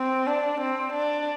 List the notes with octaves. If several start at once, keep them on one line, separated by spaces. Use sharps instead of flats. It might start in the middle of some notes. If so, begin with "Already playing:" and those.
Already playing: C4
D4
C4
D4